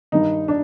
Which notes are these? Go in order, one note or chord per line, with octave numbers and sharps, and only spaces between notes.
G2 D#3 D#4
D4